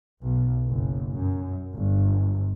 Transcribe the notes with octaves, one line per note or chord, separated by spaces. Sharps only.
B1
F#1
F#2
G1